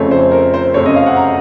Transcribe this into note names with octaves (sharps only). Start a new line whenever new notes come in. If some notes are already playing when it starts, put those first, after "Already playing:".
Already playing: F2 C#3 A3 C4 C#5
C5
A#4
C5
F#2 C#3 A3 C4 C#5
D#5
F5
F#5
A#5